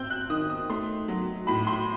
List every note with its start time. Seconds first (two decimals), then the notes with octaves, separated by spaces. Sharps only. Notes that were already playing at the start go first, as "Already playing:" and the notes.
Already playing: C4 E6 G6
0.10 F#6
0.30 D#3 D#6
0.50 D#6
0.70 A3 C6
1.08 F#3
1.47 A2 B5
1.67 C6